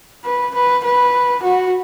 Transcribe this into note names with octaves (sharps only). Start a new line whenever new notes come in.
B4
B4
B4
F#4